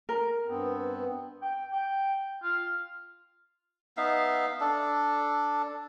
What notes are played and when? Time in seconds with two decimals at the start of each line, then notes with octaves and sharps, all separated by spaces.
0.09 A#4
0.47 G2 B3 C4
1.42 G5
1.73 G5
2.43 F4
3.97 B3 D#4 E5 F5
4.60 D4 A4